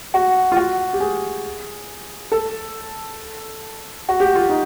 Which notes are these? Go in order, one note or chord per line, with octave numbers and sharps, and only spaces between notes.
F#4
F4
F#4
G4
G#4
A4
F#4
G4
F4
D#4